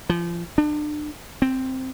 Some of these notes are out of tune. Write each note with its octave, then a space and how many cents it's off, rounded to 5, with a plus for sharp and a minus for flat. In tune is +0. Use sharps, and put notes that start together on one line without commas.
F3 -30
D4 +35
C4 +0